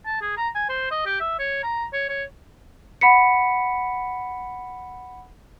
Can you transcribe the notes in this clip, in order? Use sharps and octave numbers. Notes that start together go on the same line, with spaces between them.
A5
G#4
A#5
G#5
C5
D#5
G4
E5
C#5
A#5
C#5
C#5
F#5 B5 B6 C#7